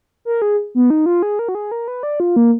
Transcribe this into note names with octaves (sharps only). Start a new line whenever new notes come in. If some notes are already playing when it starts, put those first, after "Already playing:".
A#4
G#4
B3
D#4
F4
G#4
A#4
F#4
G#4
A#4
B4
D5
F4
A#3